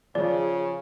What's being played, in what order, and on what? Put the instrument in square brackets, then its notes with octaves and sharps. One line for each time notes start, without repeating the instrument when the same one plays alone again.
[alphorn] C#3 [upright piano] F3 [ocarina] G#4 [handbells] D5